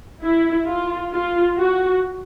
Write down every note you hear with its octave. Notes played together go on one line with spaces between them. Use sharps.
E4
F4
F4
F#4